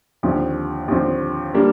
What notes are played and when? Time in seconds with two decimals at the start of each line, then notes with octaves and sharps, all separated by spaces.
0.23 D#2 D3 F3 C4
0.88 D#2 D3 F3 C4
1.54 G3 A#3 D4